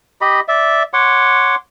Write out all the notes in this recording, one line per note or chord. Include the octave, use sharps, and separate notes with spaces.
G4 D#5 B5
D5 E5
C#5 F#5 C6 D6